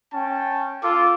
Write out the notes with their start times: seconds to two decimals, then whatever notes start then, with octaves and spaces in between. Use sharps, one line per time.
0.14 C#4 G5 A5
0.84 F4 A4 D6